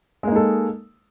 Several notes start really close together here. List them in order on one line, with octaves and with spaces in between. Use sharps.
G#3 A#3 D#4 A4